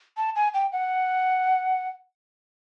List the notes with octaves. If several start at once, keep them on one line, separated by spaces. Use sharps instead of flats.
A5
G#5
G5
F#5